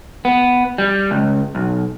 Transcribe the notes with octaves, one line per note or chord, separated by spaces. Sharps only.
B3
G3
C#2
B1